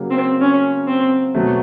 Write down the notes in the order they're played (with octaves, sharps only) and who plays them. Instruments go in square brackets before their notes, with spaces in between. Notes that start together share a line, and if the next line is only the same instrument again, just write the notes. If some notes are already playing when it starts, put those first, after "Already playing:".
Already playing: [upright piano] C#3 F#3 A#3
[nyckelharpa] C4
C#4
C4
[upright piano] B2 F#3 A3